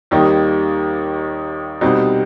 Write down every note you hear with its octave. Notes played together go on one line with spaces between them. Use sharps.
D#2 D#3 G3 A#3 D#4
C2 B2 G3 C4 D#4